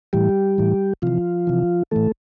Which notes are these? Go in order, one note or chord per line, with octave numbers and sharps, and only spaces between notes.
A2 E3 G3 G4
A2 E3
C3 E3 F3 F4
C3 E3
A2 E3 A3 A4